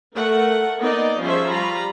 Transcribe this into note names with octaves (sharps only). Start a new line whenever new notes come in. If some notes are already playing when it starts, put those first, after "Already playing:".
A3 A#4 F#5
A#3 B3 D#4 D5 D#5
F3 G3 C#4 G#4 C5 E5
G3 F4 A#5 B5